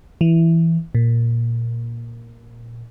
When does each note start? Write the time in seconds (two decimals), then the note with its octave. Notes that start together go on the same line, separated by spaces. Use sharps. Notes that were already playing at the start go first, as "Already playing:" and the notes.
0.21 E3
0.95 A#2